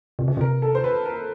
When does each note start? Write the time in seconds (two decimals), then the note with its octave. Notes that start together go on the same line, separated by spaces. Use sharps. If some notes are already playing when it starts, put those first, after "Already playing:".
0.19 C3
0.28 C#3
0.37 C3 A#4
0.62 A4
0.75 C5
0.84 B4
1.05 A#4